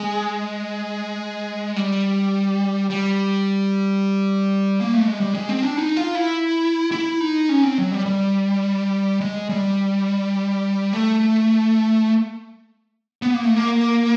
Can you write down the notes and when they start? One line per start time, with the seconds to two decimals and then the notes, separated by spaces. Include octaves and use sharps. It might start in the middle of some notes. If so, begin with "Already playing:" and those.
Already playing: G#3
1.76 G3
2.90 G3
4.80 A#3
4.93 A3
5.07 G#3
5.20 G3
5.34 G#3
5.49 C4
5.63 D4
5.77 D#4
5.96 F4
6.15 E4
6.92 E4
7.20 D#4
7.49 C#4
7.63 C4
7.78 F#3
7.92 G3
8.06 G3
9.21 G#3
9.49 G3
10.93 A3
13.22 B3
13.34 A#3
13.45 A3
13.56 A#3